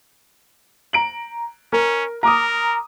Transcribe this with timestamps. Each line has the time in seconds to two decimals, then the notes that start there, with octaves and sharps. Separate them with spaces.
0.93 A#5 D7 F#7
1.73 C#4 A#4
2.23 A#4 A#5 D6 D#6